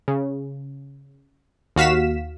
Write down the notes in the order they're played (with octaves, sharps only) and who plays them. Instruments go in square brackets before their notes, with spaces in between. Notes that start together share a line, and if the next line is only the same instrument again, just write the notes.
[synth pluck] C#3
D#2 F#4 F5 B6 E7